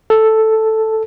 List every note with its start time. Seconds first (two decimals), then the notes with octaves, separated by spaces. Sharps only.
0.10 A4